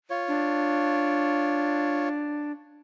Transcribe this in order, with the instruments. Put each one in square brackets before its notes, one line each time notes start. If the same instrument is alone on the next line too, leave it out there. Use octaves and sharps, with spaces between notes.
[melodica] F4 C#5
[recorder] D4